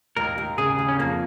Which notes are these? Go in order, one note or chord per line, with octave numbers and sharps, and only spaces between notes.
D#2 A#4
D#2
C#3 G#4
D#2
C#4
F2 A#3